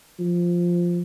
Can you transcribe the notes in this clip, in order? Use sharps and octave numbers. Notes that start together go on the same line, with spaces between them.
F3